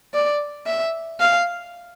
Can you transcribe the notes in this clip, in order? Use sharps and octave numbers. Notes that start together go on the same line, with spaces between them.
D5
E5
F5